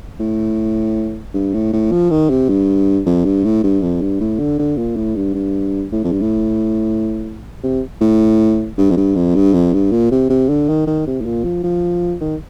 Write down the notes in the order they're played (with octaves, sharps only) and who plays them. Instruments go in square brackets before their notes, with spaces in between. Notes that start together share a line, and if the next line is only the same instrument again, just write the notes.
[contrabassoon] A2
G2
A2
A2
F3
D#3
C3
G2
F2
G2
A2
G2
F2
G2
A2
D3
D3
A#2
A2
G2
G2
A2
F2
G2
A2
C3
A2
G2
F2
G2
F2
G2
F2
G2
A#2
C3
C3
D3
D#3
D#3
C3
A2
A#2
F3
F3
D#3